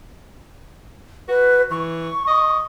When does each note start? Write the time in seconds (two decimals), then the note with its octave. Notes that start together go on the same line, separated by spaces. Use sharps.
1.29 F#4 B4
1.70 E3 C#6
2.28 D#5